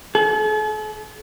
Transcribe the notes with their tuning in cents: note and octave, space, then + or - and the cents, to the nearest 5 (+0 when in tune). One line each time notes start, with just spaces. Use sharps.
A4 -45